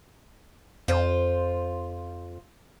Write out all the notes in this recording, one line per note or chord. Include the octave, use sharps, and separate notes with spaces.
F2 F4 C5